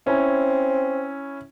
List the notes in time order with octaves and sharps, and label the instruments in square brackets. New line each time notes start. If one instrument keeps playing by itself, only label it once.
[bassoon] C4 [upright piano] C#4 E4 G#5